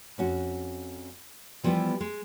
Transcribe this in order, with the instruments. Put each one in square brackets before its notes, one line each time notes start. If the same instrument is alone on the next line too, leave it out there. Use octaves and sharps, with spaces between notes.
[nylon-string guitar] F2 C#4 F#4
E3 F3 G3 B3 E4 G4
G#3